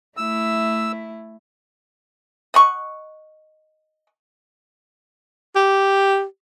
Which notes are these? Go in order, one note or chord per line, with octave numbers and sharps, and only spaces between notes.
A3 E4 E6
D#5 F#5 C#6
G4